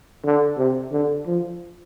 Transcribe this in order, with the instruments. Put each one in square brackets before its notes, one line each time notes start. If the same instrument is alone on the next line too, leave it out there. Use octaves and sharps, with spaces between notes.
[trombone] D3
C3
D3
F3